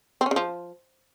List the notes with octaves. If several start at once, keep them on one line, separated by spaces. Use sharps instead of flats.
C4
C#4
C#3
F3